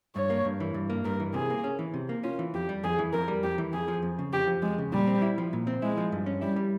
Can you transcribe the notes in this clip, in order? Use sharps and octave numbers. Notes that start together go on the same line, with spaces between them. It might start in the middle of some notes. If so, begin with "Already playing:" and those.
G2 C#5
A#3
G2
E3
G2
A#3
G2 A#4
E3
C3 G#4
A#3
C#4
E3
C3
A#3
C#4 F4
E3
F2 G4
G3
F2 G#4
E3
F2 A#4
G3
F2 G4
E3
F2 G#4
F3
F2
C#3
F2 G4
F3
F2 G#3
C#3
A#2 G3
C4
E4
F3
A#2
C4
G#3 E4
F3
G2
C#4
G3 E4
G3